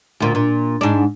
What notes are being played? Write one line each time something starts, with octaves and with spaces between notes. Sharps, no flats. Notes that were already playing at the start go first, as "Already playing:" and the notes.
D2 A#2
A#2
G#2 D4